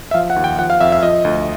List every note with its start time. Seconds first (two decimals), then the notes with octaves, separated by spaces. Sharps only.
0.11 E5
0.14 F3 F5
0.30 F#5
0.36 D#2
0.44 G5
0.59 F3 F#5
0.70 F5
0.81 F2 E5
0.92 E5
1.03 F3 D#5
1.25 D2